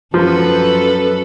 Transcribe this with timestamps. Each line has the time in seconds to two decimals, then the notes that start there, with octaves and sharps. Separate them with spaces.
0.14 F#2 F3 A4 B4